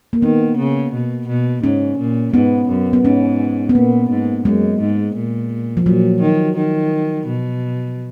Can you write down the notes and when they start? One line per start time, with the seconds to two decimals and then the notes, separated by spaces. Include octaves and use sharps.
0.13 A#3
0.22 D#3 B3
0.58 C#3
0.93 B2
1.28 B2
1.64 G#2 C#4
1.99 A#2
2.34 G#2 B3
2.69 F#2
2.93 B3
3.04 G#2 C#4
3.69 B3
3.75 A#2 A#3
4.10 G#2
4.45 F#2 G#3
4.80 G#2
5.16 A#2
5.77 F3
5.86 A#2 F#3
6.21 D#3
6.57 D#3
7.27 B2